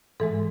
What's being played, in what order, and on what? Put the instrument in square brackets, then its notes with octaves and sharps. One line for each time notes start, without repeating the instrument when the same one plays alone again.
[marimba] G#2 E3 G#3 A4